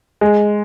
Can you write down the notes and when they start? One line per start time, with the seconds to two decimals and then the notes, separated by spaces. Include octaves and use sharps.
0.21 G#3